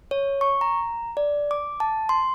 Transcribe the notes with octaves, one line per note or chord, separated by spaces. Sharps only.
C#5
C#6
A#5
D5
D6
A5
C6